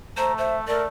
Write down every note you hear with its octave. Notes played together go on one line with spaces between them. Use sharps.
A3 C5 A#5
C5 E5
A3 A#4 D5